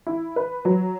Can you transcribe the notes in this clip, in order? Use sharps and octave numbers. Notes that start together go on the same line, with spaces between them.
E4
B4
F#3